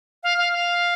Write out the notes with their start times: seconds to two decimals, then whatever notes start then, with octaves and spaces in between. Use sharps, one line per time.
0.23 F5
0.38 F5
0.52 F5